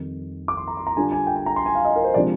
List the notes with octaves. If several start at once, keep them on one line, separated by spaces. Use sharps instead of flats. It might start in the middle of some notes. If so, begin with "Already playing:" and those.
Already playing: F2 D#3 G3
D6
C6
A#5
C6
A#5
D3 G3 D4 F4 G#5
G#5
G5
G#5
A#5
C6
G#5
F5
D#5
A#4
C5
C3 F3 G#3 D4 D5